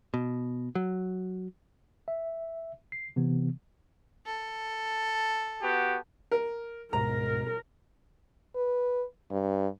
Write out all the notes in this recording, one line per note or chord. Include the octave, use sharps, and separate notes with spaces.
B2
F#3
E5
C7
C3 E3 B3
A4
B3 F#4 G4
A#4
D1 G#2 B2 A#4 A#5
B4
G2